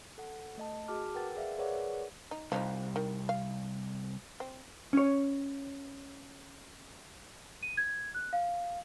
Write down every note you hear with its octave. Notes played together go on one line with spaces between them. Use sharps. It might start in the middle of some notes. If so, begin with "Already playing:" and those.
A4 F#5
A3 D#5 A5
F#4 G#4 A5 D6 F6
A#4 B4 F#5 G5 A6
G#4 D5 E5 F5
G#4 A#4 B4 C#5 D5 F#5
D#4
C2 F3 D4 D#4
D#3
F5
C4
C#4 C#5
D#7
G#6
F#6
F5